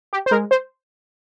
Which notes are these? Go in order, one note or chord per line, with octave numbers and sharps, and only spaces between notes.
G4
C5
G#3 A#4
C5